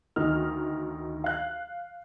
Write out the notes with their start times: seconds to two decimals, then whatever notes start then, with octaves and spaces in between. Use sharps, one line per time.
0.16 D2 D#3 D#4 F6
1.24 F5 F#6